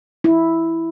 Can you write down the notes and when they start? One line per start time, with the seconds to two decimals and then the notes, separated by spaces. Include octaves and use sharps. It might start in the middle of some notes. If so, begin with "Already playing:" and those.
0.24 E4